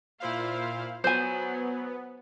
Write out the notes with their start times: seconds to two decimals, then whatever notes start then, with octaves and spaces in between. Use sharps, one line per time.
0.20 A#2 E4 F4 C5 F5
1.04 F#3 B3 C5 G#5